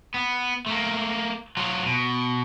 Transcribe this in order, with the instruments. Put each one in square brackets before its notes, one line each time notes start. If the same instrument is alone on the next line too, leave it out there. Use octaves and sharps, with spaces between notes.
[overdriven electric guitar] B3
A3 A#3
F#3 F4
B2